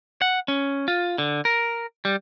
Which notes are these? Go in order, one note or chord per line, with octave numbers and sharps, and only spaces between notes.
F#5
C#4
F4
D3
A#4
G3